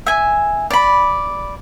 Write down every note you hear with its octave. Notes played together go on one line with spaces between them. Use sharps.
E5 G#5
D5 B5